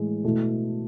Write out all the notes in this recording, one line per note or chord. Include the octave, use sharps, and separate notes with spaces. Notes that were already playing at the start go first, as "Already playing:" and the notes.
Already playing: A2 E3 G#3
B2 A3 E4